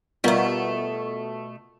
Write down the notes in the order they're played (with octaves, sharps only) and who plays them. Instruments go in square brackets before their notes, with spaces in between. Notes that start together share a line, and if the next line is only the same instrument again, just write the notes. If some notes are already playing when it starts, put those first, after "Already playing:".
[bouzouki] B2 A3 [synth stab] G3 B3 [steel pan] F4 A#4